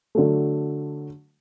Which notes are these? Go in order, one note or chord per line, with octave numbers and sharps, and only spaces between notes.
D3 F#3 A3